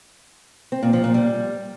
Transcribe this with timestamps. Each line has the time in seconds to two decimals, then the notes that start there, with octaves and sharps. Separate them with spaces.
0.72 C4
0.83 A#2
0.93 F3
1.04 A#2
1.14 G3